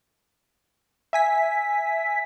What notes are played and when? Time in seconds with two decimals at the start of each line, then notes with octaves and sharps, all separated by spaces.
1.13 E5 G#5 B6